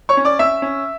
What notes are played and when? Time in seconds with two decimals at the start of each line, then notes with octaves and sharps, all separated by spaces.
0.09 C#5 C#6
0.17 C#4
0.25 D5 D6
0.39 C#4 E5 E6
0.62 C#4